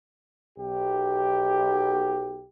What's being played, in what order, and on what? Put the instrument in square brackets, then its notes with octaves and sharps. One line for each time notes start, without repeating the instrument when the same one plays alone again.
[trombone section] B1 G4